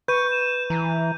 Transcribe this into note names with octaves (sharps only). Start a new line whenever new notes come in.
B4 C#6 G6 D#7
E7
E3 A#5